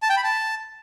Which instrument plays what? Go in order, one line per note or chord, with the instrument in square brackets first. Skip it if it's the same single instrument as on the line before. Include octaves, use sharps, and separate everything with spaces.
[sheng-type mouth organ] A5
G5
B5
A5